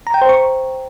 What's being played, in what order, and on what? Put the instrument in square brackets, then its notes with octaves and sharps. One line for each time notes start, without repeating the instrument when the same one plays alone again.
[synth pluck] A#5
G5
C5
C#6